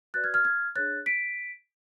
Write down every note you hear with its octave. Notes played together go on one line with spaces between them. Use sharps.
F#4 B4 D5 F#6 A6
F6 G#6
F6 G#6
F6 G#6
D4 G#4 C#5 F#6 A6
B6 D7